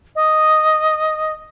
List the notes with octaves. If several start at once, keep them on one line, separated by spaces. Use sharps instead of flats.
D#5